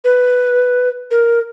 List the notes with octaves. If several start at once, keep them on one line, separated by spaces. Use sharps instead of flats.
B4
A#4